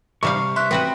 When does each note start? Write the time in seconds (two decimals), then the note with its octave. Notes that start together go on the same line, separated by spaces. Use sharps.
0.23 C3 G3 F5 C#6
0.56 E5 C6 F#6
0.71 B3 C4 F#4 B4